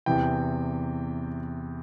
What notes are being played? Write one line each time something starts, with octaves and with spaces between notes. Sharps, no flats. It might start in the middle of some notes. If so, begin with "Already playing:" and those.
E2 C3 E3 G5